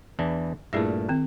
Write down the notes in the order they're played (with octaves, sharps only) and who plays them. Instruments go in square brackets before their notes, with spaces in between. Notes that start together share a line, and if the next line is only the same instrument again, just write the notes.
[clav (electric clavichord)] E2 E3 D4
[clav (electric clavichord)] G2 A#2 A3 [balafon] E4 G#4 E5
[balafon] D#3 C4